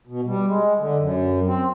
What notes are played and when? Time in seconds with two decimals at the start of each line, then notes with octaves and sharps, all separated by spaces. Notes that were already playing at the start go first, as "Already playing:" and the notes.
0.07 B2
0.27 G3
0.47 G#3
0.79 D3
0.98 F#2
1.47 C4